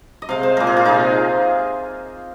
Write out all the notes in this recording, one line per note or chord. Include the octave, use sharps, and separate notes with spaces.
D#5
C3 G#3 F5
C5
A#2 G#3 A#4
G#4
F4
C3 G#3 D#4